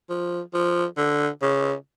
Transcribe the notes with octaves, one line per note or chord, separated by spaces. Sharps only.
F3
F3
D3
C#3